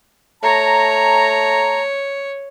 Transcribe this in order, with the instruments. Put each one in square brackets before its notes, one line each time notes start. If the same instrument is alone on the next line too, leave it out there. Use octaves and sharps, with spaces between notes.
[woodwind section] A3 A5 A#5 [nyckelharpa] C#5